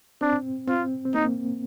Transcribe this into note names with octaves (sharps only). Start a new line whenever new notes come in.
C4 D4
C4 F4
C4
A#3 D#4